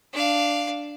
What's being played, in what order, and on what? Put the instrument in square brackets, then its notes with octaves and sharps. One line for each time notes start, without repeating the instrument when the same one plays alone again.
[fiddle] D4 F5